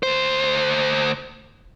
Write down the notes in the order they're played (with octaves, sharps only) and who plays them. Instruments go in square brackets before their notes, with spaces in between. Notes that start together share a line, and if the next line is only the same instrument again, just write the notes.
[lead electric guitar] D2 C5